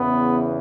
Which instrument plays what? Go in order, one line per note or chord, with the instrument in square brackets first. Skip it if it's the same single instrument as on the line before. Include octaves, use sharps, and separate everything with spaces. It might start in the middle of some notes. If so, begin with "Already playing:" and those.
Already playing: [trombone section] E2 C#3 E3 B3